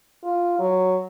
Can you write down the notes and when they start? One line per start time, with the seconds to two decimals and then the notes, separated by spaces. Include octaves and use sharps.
0.24 F4
0.59 F#3